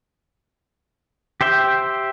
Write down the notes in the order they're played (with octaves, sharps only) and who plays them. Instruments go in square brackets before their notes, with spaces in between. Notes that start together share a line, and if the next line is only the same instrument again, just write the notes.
[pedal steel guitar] G4 C5 E5 G5